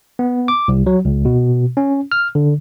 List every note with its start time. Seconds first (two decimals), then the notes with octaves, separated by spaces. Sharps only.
0.19 B3
0.48 D6
0.68 C2
0.86 F#3
1.05 C#2
1.25 B2
1.77 C#4
2.12 F6
2.35 D3